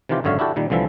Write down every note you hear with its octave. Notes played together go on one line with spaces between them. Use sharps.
C3 D#3 E3 F4 G4
G#1 F#2 D3 C#5 E5 F5
D4 E4 F#4 G4 A4
A#2 D#3 G3
C2 D3 E3 F3 E5